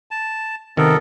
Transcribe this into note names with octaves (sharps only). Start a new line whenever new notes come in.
A5
C3 D#3 B3 A4 A#4